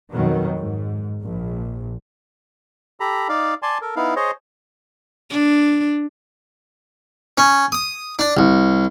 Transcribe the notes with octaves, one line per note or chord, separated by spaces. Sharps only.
F2 B2 D#3 F#3
G#2
A#1
G4 A4 A#5 B5
D#4 D5 F5
D5 G#5 A5 C6
A4 A#4
B3 D#4 E4 F5
G#4 C5 C#5 D#5
D4
C#4
D#6
D4
C2